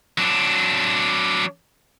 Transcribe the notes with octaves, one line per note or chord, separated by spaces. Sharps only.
F#3 D4